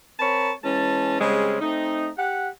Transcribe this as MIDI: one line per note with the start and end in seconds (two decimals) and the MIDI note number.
0.19 0.51 60
0.19 0.51 70
0.19 0.51 73
0.19 0.51 81
0.19 0.51 83
0.64 1.19 52
0.64 1.19 56
0.64 1.19 61
0.64 1.19 81
1.20 1.58 49
1.20 1.58 55
1.20 1.58 56
1.20 1.58 60
1.20 1.58 61
1.61 2.09 57
1.61 2.09 60
1.61 2.09 63
2.17 2.49 67
2.17 2.49 78